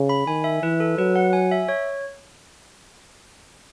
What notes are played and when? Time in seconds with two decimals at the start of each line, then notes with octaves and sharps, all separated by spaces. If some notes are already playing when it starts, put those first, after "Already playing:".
Already playing: C#3
0.09 B5
0.27 D#3 G#5
0.44 E5
0.63 E3 B4
0.80 A4
0.98 F#3 B4
1.16 F#5
1.33 G#5
1.51 E5
1.69 C#5